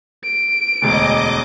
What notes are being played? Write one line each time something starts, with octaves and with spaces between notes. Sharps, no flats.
D7
E1 D2 D#5 D6